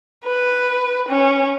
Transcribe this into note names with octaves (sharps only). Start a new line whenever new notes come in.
B4
C#4